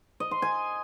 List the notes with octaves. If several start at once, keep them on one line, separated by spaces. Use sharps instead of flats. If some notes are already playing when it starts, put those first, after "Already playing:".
D#5
C6
G#5